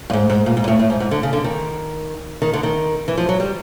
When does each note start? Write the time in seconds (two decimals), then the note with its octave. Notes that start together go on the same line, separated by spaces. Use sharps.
0.10 G2
0.13 G#2
0.30 G#2
0.46 A#2
0.57 G#2
0.64 A#2
0.68 A2
0.79 A2
0.90 G#2
1.00 G#2
1.11 D3
1.23 C#3
1.33 D3
1.44 D#3
2.42 D#3
2.53 D3
2.63 D#3
3.08 E3
3.17 F3
3.29 F#3
3.40 G3